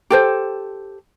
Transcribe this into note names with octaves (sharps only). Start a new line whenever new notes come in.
G4 A4 C5